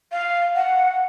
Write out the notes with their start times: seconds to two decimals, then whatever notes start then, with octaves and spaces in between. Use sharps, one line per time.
0.12 F5
0.55 F#5